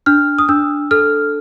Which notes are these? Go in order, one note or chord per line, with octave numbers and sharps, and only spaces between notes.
D4 F6
D#6
D4 E6
A4 F6